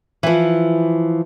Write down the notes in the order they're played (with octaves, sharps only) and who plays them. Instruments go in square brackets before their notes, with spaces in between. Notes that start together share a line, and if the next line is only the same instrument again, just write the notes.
[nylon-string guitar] E3 F3